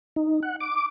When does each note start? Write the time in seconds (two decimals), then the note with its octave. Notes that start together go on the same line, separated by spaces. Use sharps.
0.16 D#4
0.43 F#5
0.60 D6